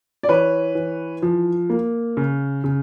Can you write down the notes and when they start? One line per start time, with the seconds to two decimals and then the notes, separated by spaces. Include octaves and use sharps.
0.23 D5
0.29 E3 B4 C#5
0.75 E3
1.22 F3
1.70 A#3
2.17 C#3
2.64 C#3